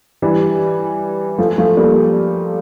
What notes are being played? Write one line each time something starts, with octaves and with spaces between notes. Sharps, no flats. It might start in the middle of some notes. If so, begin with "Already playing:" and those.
E3 G3
F3 A3
F3 A3
G3 A#3